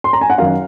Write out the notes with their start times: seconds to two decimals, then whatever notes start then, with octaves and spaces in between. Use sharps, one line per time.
0.04 C6
0.13 A#5
0.21 G#5
0.30 F#5
0.38 F#2 D#3 F#3 F5